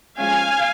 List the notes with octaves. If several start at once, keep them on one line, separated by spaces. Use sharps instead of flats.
F3 G#3 C#4 F5 G#5